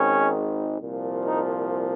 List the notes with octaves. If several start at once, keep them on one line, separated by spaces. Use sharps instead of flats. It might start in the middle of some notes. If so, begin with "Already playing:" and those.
Already playing: G#1 G#2 D#3 C#4
C2 A#2 F3
D#4